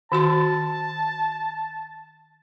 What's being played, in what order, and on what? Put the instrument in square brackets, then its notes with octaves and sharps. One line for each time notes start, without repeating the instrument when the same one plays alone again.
[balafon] D#3 F#4 C6 [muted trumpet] A5